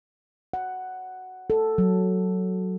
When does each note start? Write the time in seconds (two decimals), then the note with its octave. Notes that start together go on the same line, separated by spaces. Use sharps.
0.54 F#5
1.50 A4
1.78 F#3